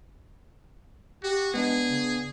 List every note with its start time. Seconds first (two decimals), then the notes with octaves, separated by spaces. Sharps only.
1.23 F#4 G4
1.54 G#3 B3 D4 G#4
1.85 C#3